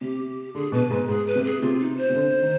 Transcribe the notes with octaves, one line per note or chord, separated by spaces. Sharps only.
C3 G4
D3 G#4
B2 B4
G#2 B4
G#2 G#4
B4
C3
G#4
C3 F4
D#4
C5
C3
D3
D#3